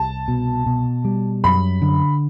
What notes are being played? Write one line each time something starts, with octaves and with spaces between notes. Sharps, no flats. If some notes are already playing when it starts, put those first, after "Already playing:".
Already playing: C2 A5
B2
B2
G3
F#2 B5
D3